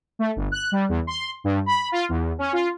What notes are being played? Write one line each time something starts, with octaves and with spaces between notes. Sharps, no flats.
A3
G1
F#6
G3
E2
C6
G2
B5
F4
E2
C#4
F4